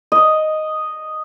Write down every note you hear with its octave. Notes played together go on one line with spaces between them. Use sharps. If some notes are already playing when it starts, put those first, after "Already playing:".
D#5